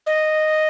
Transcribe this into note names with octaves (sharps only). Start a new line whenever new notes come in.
D#5